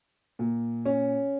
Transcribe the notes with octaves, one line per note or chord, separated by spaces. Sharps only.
A#2
C#4